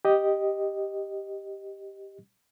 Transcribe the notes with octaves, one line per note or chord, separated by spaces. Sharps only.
G4 D#5